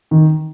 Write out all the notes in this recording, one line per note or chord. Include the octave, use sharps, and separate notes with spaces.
D#3